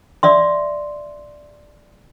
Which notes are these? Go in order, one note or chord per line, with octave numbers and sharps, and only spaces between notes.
D5 E5 C6